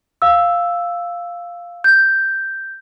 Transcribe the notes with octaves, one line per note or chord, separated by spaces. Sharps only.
F5 E6
G6